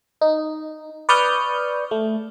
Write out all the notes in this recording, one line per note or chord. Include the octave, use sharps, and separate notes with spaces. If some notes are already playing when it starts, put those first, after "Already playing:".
D#4
B4 D5 C#6 D#6 F6 G6
A3